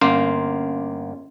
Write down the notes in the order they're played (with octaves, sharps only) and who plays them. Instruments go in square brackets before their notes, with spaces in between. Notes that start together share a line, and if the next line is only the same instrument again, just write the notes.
[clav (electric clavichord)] G1 A#3 F5 [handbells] C#4 C6